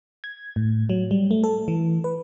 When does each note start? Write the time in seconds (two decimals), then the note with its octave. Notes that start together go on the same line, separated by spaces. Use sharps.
0.24 G#6
0.56 A2
0.90 F#3
1.11 G3
1.31 A3
1.44 A4
1.68 E3
2.04 B4